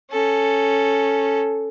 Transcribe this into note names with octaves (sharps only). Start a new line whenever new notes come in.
C#4 A4